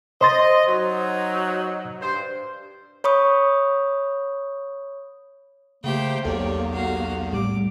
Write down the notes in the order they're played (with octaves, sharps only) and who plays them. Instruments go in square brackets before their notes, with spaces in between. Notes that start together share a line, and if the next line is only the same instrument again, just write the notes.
[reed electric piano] C5 C6 A6 [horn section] D#5
[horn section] F#3 D#4
G2 C5
[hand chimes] C#5 B5 C#6 D#6
[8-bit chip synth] C#3 A3 G4 [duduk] A#3 [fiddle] C5 G5
[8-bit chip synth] B1 E2 [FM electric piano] G4 A4 [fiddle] C#5 D5
[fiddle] F#4 F5
[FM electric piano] A2 G3 [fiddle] D6